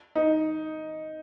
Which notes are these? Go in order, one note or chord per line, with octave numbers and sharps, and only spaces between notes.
D#4